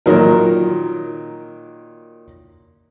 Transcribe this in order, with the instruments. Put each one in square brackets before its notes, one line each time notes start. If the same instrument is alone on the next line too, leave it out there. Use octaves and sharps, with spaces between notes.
[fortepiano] A#2 D#3 F#3 A#4